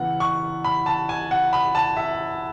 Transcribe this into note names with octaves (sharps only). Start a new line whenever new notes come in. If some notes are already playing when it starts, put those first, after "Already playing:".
Already playing: C#3 E3 B3 F#5
C#6
B5
A5
G#5
F#5
B5
A5
E5